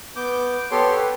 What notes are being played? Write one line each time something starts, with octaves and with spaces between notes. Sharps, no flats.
B3 D6 G6
B3 G4 A4 C#5 C6
B4